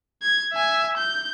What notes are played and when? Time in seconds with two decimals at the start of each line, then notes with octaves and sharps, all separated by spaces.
0.22 G#6
0.53 E5 G#5
0.97 G6